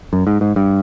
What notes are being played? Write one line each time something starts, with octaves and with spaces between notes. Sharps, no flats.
F#2
G#2
G#2
G2